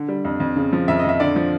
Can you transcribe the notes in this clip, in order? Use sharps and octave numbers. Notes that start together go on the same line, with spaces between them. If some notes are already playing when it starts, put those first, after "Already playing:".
Already playing: D3
G3
F2
F2
C#3
F3
F2 E5
D#5
F2 E5
D3 D5
F3